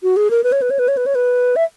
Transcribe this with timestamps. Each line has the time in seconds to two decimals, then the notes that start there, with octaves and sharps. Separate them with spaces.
0.03 F#4
0.17 G#4
0.31 A#4
0.44 B4
0.52 C#5
0.62 B4
0.71 C#5
0.79 B4
0.88 C#5
0.97 B4
1.06 C#5
1.15 B4
1.56 E5